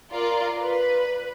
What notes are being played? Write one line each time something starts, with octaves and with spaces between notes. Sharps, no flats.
F4 A#4 D5
B4